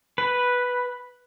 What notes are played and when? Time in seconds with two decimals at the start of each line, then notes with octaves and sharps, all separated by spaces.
0.18 B4